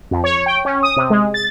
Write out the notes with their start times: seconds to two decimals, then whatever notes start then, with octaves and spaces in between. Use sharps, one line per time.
0.11 F2
0.24 C#5
0.46 G5
0.65 C#4
0.83 D#6
0.97 C3
1.10 G#3
1.34 A6